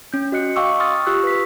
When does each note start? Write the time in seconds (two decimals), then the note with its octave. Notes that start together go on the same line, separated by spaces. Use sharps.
0.13 C#4 G6
0.32 F#4 D#5 F#6 C#7
0.56 D#5 F5 G5 C#6 D6 E6
0.79 C6 C#6 D#6 F6 A6
1.06 F4 G4 C#6 E6 F#6
1.23 B4 B6